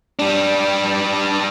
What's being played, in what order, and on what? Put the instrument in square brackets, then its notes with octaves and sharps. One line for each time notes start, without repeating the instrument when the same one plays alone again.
[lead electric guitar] G3 D4